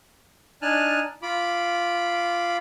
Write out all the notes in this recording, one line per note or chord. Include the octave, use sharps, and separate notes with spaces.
D4 D#4 G#5 A5 F6 F#6
F4 B5 D6